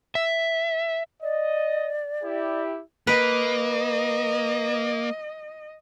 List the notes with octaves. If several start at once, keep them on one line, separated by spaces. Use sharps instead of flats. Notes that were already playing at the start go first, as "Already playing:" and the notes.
E5
D5 D#5
E4 G4
A#3 B4 D#5